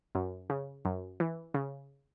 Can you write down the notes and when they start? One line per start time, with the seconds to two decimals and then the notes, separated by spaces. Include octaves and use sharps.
0.15 F#2
0.50 C#3
0.85 F#2
1.20 E3
1.54 C#3